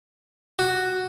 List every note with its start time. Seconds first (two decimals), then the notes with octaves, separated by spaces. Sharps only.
0.59 F#4